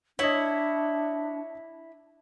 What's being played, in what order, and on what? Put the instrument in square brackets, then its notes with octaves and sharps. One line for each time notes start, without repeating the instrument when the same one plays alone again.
[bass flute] D4 [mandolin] E4 [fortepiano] C#5 D#5